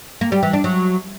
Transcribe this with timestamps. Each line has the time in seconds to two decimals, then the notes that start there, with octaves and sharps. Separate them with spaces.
0.21 A#3
0.32 G3
0.43 E3
0.53 D4
0.64 F#3